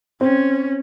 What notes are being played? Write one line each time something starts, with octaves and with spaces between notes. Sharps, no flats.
C4 C#4